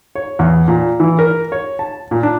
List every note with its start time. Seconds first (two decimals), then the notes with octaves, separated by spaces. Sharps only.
0.15 C#5
0.39 E2
0.68 A#2
1.00 E3
1.19 A#4
1.52 C#5
1.79 A5
2.11 A#2
2.23 D4